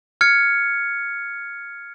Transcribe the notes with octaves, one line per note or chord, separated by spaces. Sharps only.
F6 G#6 C#7